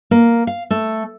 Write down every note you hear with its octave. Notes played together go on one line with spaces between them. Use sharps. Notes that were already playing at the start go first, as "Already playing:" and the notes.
A#3
F5
A3